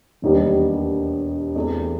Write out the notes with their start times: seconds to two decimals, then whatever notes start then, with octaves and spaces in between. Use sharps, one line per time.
0.22 E1 D#2 D#3 G3 B3
1.56 E2 B2 A3 C4